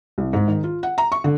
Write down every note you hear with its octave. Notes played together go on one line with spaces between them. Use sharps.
C2
G#2
D#3
F4
F#5
A#5
C#6
D3